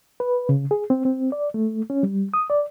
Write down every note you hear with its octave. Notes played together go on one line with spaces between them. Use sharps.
B4
C#3
G#4
C4
C4
D5
A3
C#4
G3
D#6
D5